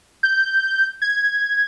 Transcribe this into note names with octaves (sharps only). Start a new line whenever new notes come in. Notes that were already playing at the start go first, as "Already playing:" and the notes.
G6
G#6